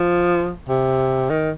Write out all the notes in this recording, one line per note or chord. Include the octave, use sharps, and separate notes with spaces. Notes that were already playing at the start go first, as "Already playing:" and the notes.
Already playing: F3
C3
D#3